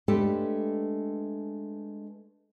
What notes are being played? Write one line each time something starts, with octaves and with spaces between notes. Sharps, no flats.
G#3 A3 D4 G4 A4 B4